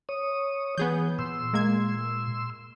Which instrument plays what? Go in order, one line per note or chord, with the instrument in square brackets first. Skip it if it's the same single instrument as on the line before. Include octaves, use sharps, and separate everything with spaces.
[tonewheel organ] C#5 D#6
[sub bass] E3 [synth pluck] B3 G#4 G6
[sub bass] A#2 [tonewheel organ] C6 E6
[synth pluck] G#3 A#3 G#6